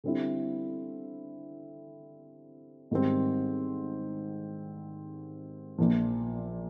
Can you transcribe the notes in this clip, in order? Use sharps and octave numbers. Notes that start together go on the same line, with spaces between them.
D3 G3 C4 E4
G#2 D#3 G3 C4
A#1 A#2 F3